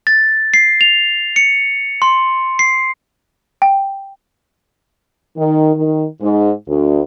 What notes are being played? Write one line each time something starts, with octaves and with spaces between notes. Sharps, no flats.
A6
C7
F7
C#7
C6
C7
G5
D#3
D#3
G#2
D2